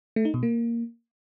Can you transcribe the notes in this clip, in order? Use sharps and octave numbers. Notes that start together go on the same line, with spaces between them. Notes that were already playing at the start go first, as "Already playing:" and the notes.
A3
D#4
B2
A#3